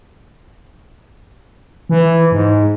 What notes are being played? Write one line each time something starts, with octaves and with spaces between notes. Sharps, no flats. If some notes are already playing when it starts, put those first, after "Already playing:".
E3
G#2